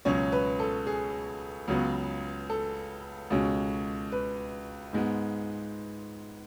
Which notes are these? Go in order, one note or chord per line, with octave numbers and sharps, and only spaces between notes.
C#2 B2 F#3 C#4 C#5
B4
A4
G#4
C#2 C#3 F#3 B3
A4
C#2 B2 G#3 C#4
B4
G#2 G#3 B3